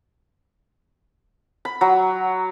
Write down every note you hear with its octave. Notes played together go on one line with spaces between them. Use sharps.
B5
F#3